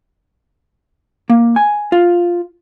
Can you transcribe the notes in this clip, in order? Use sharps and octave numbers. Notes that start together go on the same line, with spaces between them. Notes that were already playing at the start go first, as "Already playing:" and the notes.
A#3
G#5
F4